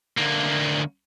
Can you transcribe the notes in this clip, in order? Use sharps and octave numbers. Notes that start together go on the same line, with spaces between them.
D2 A#3